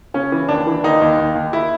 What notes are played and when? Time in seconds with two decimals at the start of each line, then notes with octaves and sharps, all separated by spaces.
0.14 C#3 C#4
0.32 E3
0.49 D#2 D4
0.67 E3
0.83 D#2 D#4
1.02 D#2
1.19 D#2
1.35 D#2
1.53 E4